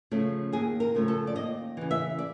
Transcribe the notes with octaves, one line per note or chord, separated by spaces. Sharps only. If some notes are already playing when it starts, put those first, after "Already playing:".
C#3 F3 A3
D#2 G#4
A#4
C#3 F3 A3
A4
D5
D#2 D#5
C#3 E3
E5
D5